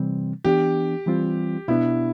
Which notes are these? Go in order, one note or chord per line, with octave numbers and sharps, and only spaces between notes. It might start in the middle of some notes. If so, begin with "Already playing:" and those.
Already playing: C3 E3 G3 C4
E3 B3 D4 G4
E3 G3 C4 F4
B2 B3 D4 E4